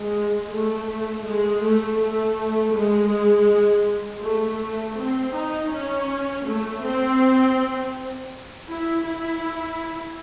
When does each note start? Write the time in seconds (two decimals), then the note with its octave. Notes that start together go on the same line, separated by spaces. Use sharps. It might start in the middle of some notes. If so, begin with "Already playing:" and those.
Already playing: G#3
0.52 A3
1.26 G#3
1.63 A3
1.99 A3
2.74 G#3
4.22 A3
4.97 C4
5.34 D#4
5.71 C#4
6.45 A3
6.82 C4
8.68 E4
9.04 E4